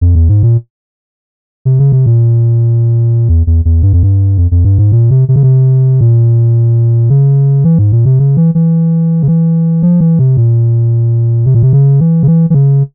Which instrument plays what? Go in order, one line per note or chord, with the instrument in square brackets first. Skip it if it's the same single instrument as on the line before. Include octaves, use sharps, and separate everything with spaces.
[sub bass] F2
E2
G#2
A#2
C3
C#3
C3
A#2
E2
E2
E2
G2
F2
G2
F2
F2
G2
G#2
A#2
C3
C3
C#3
C3
A#2
C#3
E3
G#2
A#2
C3
C#3
E3
E3
C#3
E3
F3
E3
C3
A#2
C3
A#2
C3
C#3
E3
C#3
E3
E3
C#3